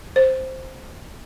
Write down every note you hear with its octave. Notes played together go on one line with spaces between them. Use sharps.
C5